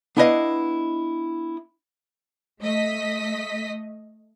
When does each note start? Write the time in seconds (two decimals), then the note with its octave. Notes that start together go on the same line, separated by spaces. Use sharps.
0.17 B3 D4 E4 B4 D#5 F5
2.61 A3 D#5 B6